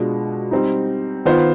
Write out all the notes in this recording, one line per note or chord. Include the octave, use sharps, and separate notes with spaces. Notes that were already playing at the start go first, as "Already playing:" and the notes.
Already playing: B2 G#3 D4 F4
G3 C4 D#4
D#3 B3 F4 C5